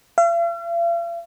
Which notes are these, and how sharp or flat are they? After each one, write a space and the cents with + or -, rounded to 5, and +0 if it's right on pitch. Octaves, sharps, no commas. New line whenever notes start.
F5 -45